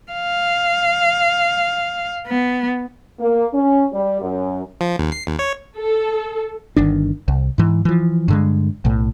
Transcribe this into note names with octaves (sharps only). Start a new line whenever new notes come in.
F5
B3
A#3
C#4
G3
F#2
F3
D#2
C7
D#2
C#5
A4
G1 D#3 D4
C2
G#2 E3
E3 F3
G2 D3 G#3
B1 A2